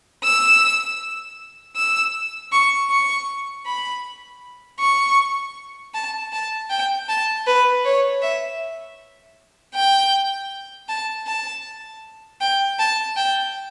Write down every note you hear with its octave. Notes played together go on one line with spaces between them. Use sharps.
E6
E6
C#6
C#6
B5
C#6
A5
A5
G5
A5
B4
C#5
E5
G5
A5
A5
G5
A5
G5